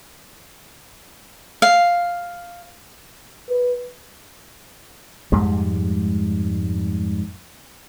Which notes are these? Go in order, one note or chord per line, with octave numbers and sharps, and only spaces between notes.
F5
B4
F2 G#2 G3 G#3